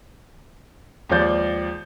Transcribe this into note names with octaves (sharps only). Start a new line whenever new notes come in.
D#2 F3 G#3 D5 G6